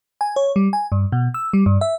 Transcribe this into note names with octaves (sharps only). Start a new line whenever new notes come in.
G#5
C#5
G3
G#5
G2
B2
E6
G3
G2
E5